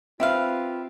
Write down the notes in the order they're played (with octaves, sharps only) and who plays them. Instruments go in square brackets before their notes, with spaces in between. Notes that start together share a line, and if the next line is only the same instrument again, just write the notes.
[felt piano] C4 [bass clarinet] F4 [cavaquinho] G4 B4 F5 [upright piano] E5